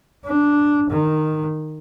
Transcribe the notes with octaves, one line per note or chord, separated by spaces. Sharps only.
D4
D#3